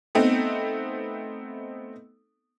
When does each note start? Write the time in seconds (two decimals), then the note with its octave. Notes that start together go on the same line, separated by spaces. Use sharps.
0.15 A3 B3 C4 D#4